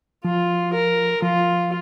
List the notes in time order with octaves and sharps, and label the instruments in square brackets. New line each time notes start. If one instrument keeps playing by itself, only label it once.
[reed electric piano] F3 [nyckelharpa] F4
[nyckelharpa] A#4
[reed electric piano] F3 [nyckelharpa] F4